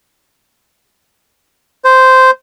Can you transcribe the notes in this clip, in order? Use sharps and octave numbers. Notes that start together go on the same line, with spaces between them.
C5